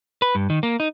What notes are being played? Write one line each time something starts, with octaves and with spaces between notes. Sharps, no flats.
B4
G2
D#3
A#3
D#4